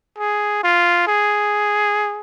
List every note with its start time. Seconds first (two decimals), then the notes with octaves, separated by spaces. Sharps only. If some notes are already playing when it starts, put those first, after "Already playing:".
0.18 G#4
0.63 F4
1.07 G#4